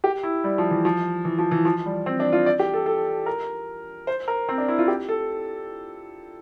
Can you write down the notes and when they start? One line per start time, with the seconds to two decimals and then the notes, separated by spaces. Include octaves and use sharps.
0.04 G4
0.23 E4
0.44 G3
0.58 F3
0.71 E3
0.85 F3
1.25 E3
1.38 F3
1.51 E3
1.65 F3
1.86 G3
2.06 C4
2.20 D4
2.33 F4
2.46 D5
2.59 G4
2.74 A4
2.86 A4
3.26 A#4
4.07 C5
4.28 A#4
4.49 C4
4.58 D4
4.68 E4
4.78 F4
4.88 G4
5.09 A4